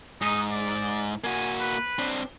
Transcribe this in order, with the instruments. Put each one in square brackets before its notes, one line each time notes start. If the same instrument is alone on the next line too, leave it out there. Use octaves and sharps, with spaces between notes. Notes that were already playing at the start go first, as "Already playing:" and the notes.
[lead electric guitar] G#2 [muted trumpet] D#4
[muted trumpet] D5
[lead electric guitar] A#3 F#4 [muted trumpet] G#5
[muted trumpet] B4
[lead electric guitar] C4 D4